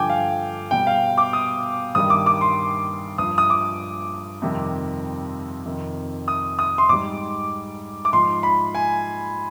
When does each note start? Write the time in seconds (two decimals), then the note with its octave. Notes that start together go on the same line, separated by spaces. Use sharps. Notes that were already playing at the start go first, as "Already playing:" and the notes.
Already playing: G2 D3 F3 G5 G#5 D6
0.09 F5
0.71 B2 G3 G5
0.87 F5
1.18 D6
1.33 D#6
1.95 G2 D#3 G3 D#6
2.10 D6
2.26 D6
2.41 C6
3.18 G2 F3 D#6
3.38 D#6
3.50 D6
4.42 F2 C3 D#3 G3
5.66 F2 C3 D#3
6.28 D#6
6.59 D#6
6.78 C6
6.89 G#2 G3 D6
8.05 D6
8.13 G#2 F3 C6
8.43 B5
8.75 G#5